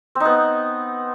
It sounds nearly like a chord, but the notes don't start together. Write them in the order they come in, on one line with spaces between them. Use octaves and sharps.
C4 D#4 B3